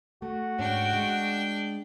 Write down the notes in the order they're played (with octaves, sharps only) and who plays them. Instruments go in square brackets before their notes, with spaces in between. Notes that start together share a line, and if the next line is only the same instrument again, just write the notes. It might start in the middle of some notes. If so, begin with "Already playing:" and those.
[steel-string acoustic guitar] A3 [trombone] F#4
[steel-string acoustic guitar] G#2 C#4 [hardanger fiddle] D4 G5
[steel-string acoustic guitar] G#3